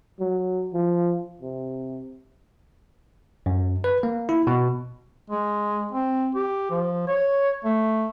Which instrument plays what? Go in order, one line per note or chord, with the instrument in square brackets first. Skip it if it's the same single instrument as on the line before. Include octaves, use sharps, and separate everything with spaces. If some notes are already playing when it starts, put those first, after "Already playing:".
[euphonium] F#3
F3
C3
[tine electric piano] F#2
B4
A#3
E4
B2
[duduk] G#3
C4
G4
F3
C#5
A3